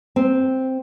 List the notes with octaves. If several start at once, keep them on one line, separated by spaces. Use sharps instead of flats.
C4